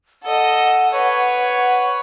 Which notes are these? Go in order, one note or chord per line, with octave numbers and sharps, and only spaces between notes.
A4 D#5 F#5
B4 C#5